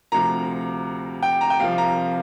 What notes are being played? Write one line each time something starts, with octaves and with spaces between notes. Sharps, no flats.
D2 C3 F3 A#5
G5
A#5
G5
C2 C3 F3 F5
A#5